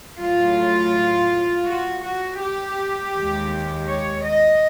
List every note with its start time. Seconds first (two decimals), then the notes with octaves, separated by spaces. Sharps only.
0.20 A2 F#3 F4
1.67 F#4
2.04 F#4
2.40 G4
3.14 D#2 D#3 G#3
3.88 C#5
4.25 D#5